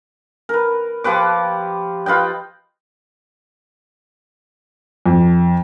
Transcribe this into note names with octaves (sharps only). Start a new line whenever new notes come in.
A#4 B4
F3 G4 B4 D6
F4 B4 D#5 G5
F2